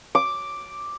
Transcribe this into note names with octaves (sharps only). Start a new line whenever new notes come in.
D6